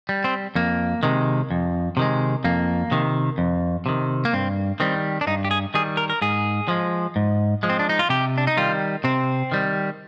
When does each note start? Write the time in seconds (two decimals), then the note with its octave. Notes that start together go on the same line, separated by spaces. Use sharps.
0.09 G3
0.24 C4
0.55 F2 A#3
1.03 C3 D#3 G#3
1.51 F2
1.97 C3 D#3 G#3
2.44 F2 A#3
2.91 C3 D#3
3.38 F2
3.86 C3 D#3
4.25 A#3
4.33 G2 C4
4.80 D#3 G3 C4
5.21 D4
5.27 G2 D#4
5.45 G4
5.51 G#4
5.74 D#3 G3 G#4
5.97 A#4
6.10 A#4
6.22 G#2 G#4
6.68 F3 G#3
7.16 G#2
7.63 F3 G#3
7.69 C4
7.79 D4
7.89 D#4
7.99 F4
8.09 C3 G4
8.38 D4
8.47 D#4
8.57 D#3 G3 F4
9.04 C3 C4
9.52 D#3 G3